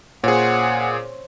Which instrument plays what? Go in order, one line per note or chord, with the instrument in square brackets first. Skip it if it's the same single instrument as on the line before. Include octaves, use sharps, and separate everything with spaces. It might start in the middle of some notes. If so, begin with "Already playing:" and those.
[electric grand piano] A#2 G#4 [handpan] C5 C#5 [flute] F#5